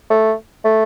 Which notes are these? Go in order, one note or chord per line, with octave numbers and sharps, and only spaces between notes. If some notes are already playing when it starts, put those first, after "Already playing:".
A3
A3